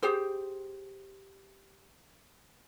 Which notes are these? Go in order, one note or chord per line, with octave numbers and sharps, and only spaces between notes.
G4 G#4 C5